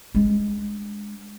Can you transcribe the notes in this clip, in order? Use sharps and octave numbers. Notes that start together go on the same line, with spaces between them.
G#3 D4